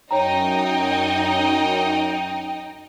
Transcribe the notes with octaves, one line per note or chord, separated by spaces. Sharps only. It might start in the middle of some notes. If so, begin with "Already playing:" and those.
F#2 D#4 C#5 D#5 G5 A#5